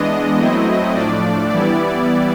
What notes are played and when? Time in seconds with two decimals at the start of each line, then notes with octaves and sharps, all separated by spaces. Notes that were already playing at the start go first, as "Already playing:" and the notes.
Already playing: E3 G#3 B3 D4 D#5
0.39 F#3 A3 C4 E4
0.94 A2 F3 A3 D4 D5
1.50 E3 G3 B3 E4 D5